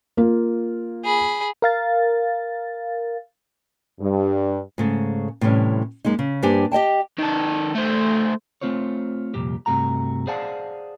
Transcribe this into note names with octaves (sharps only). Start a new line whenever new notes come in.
A#3 F4
G#4 B5
A#4 F5 A6
G2
G#2 C#3 A3
A2 C3 E3 G3 C#4
F#2 G#3 A#3 D#4
C#3
G2 A#3 D4 G4 C5 G#5
G4 D#5 G5 A5
D#3 A4
A3 C5
A3 C4 F4 C5 C#5
C2 F2 A#2 G4
G2 C3 A3 F#4 A#5
G#4 C5 D5 F5 F#5 A5